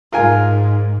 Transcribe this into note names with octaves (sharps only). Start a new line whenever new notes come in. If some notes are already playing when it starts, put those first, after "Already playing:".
G#2 F4 A#4 G#5